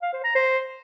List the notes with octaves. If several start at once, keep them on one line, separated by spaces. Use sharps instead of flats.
F5
C5
A#5
C5